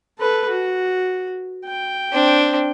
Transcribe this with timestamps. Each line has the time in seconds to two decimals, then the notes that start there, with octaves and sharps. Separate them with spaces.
0.19 A4 B4
0.49 F#4
1.66 G5
2.12 C4 D4